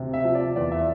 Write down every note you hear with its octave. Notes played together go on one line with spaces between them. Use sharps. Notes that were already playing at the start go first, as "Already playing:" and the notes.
Already playing: D2 C3
E5
F3
D5
E2 D5
E5